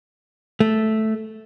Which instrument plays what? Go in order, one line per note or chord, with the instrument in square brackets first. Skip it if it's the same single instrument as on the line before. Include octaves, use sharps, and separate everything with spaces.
[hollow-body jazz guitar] A3